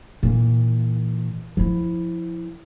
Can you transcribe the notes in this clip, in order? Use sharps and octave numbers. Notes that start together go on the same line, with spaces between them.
A#2 E3
F3 E4